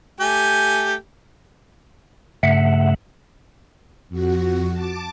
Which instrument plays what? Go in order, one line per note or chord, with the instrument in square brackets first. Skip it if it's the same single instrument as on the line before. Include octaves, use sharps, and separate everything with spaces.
[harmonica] A3 G4 G#5
[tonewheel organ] G2 C#3 A3 E5 F#5
[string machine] F2 F#4
A5 D6